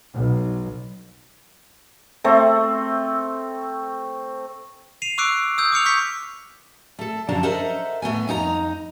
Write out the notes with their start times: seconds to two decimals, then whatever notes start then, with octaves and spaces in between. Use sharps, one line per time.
0.16 B1
2.24 A3 C4
5.02 C7 D#7 F7
5.18 C#6 D6 E6 F#6 C7 D7
5.58 D#6 E6 G6
5.72 D6 F6 C#7 F7
5.86 C#6 G6 B6 C#7
6.99 A3 A4
7.29 F#2 D3 F3 D4 A5 A#5
7.43 A4 A#4 C5 D#5 E5 F#5
8.02 A2 A3 B3 G#5
8.28 F2 D#4 G4 A#5